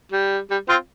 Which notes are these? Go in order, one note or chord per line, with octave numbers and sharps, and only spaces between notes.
G3
G3
C4 F4